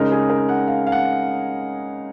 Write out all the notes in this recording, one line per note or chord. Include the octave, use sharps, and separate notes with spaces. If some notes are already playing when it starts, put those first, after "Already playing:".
Already playing: C#3 G#3 D#4 A#4
G#4
A#4
F#5
F5
F5
F#5